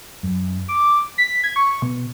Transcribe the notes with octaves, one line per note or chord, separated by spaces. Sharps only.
F#2
D6
B6
G#6
C#6
B2